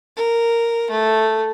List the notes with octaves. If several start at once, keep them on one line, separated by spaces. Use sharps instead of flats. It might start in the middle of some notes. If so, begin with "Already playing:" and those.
A#4
A3